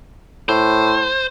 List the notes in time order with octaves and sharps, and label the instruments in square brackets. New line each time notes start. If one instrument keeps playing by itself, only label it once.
[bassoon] A2 [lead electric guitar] C5